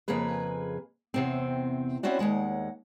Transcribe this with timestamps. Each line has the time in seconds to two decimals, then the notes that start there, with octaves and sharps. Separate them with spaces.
0.08 F2 C#3 A#3 G#4 B4
1.14 E2 C3 C4
2.03 C4 C#4 E4 F#4 D5
2.19 D#2 G#2 G#3 F#5